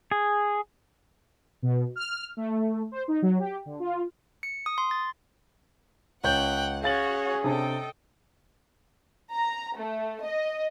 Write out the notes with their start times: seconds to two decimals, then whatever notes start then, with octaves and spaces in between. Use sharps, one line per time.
0.11 G#4
1.62 B2
1.96 F6
2.37 A3
2.92 C5
3.08 D#4
3.22 F#3
3.39 G4
3.66 D3
3.80 F4
4.43 C#7
4.66 D#6
4.78 C6
4.91 A6
6.24 C#2 C#5 F#5 G5 F#6 G6
6.84 C#4 F#4 G#4 C#5 F5 F#5 A6 F#7
7.44 C3 D4 A4 D#5 G5 A5
9.33 A#5
9.77 A3
10.24 D#5